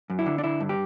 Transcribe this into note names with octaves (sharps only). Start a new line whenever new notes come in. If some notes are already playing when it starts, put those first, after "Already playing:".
F#2
E4
D3
D4
D3 E4
G2
G4